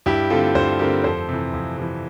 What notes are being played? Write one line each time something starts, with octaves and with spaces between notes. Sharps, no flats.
G2 E4 G4
D3 A3 C4 F4 A4
G2 A4 C5
D3 A3 C4 G4 A#4
F2 A4 C5
C3 E3
F2
C3 E3